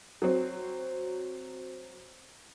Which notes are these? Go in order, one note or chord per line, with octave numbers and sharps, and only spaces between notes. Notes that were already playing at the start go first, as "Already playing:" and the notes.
F#3 C4